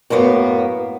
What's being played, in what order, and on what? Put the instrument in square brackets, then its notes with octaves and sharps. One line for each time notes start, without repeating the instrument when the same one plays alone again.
[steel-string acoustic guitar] F#2 A2 A#3 B3